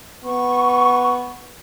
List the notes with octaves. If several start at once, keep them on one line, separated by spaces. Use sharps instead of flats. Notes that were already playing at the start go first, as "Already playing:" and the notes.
B3 C#6